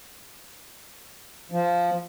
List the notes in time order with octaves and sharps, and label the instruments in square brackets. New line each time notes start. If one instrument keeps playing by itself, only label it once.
[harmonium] F3